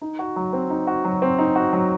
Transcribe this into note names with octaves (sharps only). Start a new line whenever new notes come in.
D#4
F#4
F#3
C4
D#4
F#4
F#3
C4
D#4
F#4
F#3